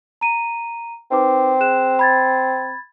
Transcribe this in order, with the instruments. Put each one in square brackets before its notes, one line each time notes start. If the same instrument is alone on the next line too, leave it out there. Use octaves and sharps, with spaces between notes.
[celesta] A#5 D#7
[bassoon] C4 [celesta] D#4 B4 D6
[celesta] G#4 F#6 E7
B5 G#6 A6